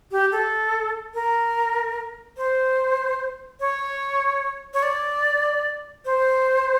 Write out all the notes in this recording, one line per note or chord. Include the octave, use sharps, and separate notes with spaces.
G4
A4
A#4
C5
C#5
C#5
D5
C5